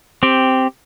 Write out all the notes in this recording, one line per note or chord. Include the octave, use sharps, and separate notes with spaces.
C4 G4